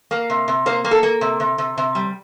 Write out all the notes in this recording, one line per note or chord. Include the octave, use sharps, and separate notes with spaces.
A#3
C3
C3
A#3 C5
A#3
A4
A#3
C3
C3
C3
C3
G3